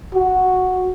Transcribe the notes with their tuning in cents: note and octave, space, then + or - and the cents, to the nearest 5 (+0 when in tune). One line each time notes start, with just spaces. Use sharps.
F#4 -5